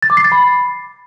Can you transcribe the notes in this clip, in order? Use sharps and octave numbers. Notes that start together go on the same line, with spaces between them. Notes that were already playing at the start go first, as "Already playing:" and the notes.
A6
D6
C7
A6
B5